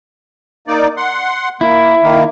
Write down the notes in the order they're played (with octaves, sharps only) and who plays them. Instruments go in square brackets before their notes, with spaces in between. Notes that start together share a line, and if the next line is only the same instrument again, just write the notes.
[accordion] A#3 D#4 D5
F#5 C6
[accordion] A#3 [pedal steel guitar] E4
[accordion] D#3 A#3